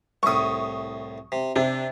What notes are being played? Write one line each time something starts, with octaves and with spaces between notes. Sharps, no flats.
C2 A2 C#6 D#6
C3
C3 D4